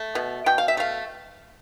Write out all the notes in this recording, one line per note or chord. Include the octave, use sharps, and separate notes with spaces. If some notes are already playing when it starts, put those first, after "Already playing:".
Already playing: A3
B2
B2 G5
F5
E5
A3 F5